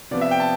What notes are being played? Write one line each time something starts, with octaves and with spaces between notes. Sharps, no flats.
C3 F3 B3 D5
E5
G5
A5